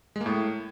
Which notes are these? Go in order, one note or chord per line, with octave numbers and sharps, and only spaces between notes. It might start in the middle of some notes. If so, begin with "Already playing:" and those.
G#3
A#3
A2